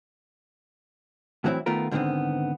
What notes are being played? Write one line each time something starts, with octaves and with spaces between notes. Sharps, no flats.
A2 E3 F#3 C4 E4
D#3 A3 B3 F4 A#4
G#2 D3 D#3 A3 B3 C4